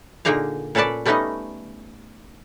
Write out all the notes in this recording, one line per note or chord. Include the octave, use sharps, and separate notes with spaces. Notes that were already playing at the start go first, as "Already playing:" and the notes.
A#2 D3 A#3 D#4 G#4 F5
A#2 C#4 A4 B4 D5 A5
G3 A3 B3 C#4 D#4 D#5